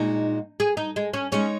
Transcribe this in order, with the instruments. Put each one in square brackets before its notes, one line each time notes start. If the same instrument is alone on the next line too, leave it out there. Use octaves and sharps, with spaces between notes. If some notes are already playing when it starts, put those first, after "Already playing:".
Already playing: [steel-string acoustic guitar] A#2 G#3 F#4 [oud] D#4
[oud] G#4
D#4
G#3
C#4
[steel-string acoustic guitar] G#3 D#4 G#4 C#5 [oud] C#4